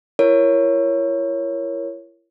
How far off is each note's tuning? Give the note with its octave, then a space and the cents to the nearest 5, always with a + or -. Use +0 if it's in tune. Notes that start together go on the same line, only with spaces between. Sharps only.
E4 +40 A#4 +0 C#5 +0